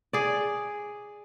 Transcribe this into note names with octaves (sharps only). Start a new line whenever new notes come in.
G#4 D5